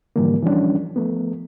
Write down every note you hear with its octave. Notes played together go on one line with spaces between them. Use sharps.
G#2 D3 E3 F3 G3 A#3
E3 F3 G3 C#4 D4
F3 A3 B3